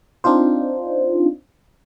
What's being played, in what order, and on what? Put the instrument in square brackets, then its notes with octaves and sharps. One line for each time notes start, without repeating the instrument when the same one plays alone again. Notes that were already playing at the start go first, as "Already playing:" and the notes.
[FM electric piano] C4 D4 D#4 F4 C5